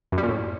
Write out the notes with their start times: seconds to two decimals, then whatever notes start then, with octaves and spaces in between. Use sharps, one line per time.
0.12 F#2
0.18 G3
0.23 A#2
0.29 A2